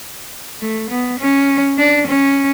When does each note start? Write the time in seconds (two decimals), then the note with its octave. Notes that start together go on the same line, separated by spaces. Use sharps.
0.61 A3
0.90 B3
1.19 C#4
1.78 D4
2.07 C#4